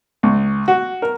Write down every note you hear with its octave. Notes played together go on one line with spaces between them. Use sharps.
C#2
F#4
A#4